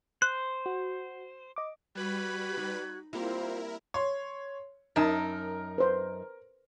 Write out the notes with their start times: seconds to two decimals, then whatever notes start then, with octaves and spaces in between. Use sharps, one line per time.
0.22 C5 F#6
0.66 F#4
1.56 D#5 D6
1.95 G3 F#4 B4 B5 F#6 G#6
2.57 D#4
3.13 G3 A#3 C4 E4 F4 A#4 C5
3.94 C#5 C6
4.96 F#2 D#4 A#4 A5
5.78 B4 C5